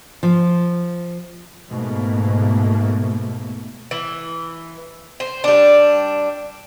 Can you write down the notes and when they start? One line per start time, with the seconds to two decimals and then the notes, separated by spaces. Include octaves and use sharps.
0.23 F3
1.70 G#2 B2 A3 A#3
3.91 E3
5.20 C5
5.44 G3 D4